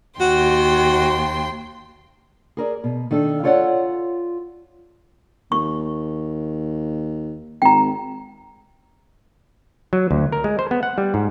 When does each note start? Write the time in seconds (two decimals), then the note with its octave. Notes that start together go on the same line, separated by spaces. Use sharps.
0.21 D#2 F#4 G5 C6
2.57 G#4 A#4 D5
2.84 B2
3.11 D#3 D4 A4
3.43 F4 A4 C#5 D5 F5 F#5
5.52 D#2 C#6
7.62 G#1 G5 A#5
9.93 F#3
10.11 D2
10.32 A#4
10.44 G#3
10.59 C5
10.71 B3
10.83 F#5
10.98 G3
11.14 G#2